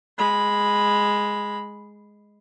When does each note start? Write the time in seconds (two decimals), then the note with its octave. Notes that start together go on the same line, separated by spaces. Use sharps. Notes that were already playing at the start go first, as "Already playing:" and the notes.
0.18 G#3 B5